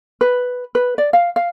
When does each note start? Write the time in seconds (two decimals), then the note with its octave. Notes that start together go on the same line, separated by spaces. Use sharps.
0.21 B4
0.75 B4
0.98 D5
1.13 F5
1.36 F5